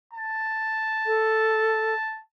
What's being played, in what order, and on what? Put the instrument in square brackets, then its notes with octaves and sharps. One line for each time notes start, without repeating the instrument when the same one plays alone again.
[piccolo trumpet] A5
[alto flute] A4